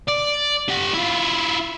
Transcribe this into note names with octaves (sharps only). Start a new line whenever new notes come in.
D5
G4 F#5
E4 F4